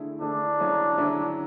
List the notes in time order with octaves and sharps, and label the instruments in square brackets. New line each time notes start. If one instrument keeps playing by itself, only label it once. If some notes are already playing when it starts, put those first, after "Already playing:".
Already playing: [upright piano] D3 A3 E4 G#4
[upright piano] D3 A3 E4 G#4 [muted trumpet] D4
[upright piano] D3 F#3 C#4 E4 G#4
D3 F#3 C#4 E4 G#4